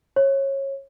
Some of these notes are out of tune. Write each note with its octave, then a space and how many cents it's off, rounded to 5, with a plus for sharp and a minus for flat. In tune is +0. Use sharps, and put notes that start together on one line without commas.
C#5 -20